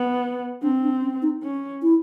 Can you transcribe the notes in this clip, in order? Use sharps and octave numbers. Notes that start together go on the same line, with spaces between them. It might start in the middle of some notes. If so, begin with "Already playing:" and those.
Already playing: B3
C4 D4
D4
C#4
D#4
C#4
E4